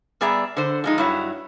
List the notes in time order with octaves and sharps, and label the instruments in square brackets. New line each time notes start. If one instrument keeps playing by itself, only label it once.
[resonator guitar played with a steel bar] G3 B3 G#4 D5 E5 A#5
D3 C5
F3 G#3 D#4
G2 F#3 E4 C#5